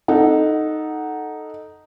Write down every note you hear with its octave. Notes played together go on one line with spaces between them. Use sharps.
D#4 A4 F#5